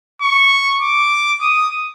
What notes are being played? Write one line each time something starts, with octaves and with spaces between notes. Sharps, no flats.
C#6
D6
D#6